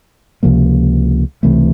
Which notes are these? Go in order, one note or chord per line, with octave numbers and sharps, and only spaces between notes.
C#2 C3 F3 A#3
C#2 C3 E3 A3